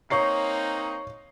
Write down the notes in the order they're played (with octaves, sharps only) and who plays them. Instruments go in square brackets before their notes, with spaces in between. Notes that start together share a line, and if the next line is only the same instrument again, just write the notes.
[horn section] A#3 C4 D#4 [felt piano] C#5 C#6 C7